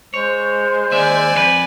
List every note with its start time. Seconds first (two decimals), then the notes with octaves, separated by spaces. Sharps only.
0.14 G#3 C5 C#5
0.92 D#2 D5 E5 G#5
1.34 F2 F#4 B4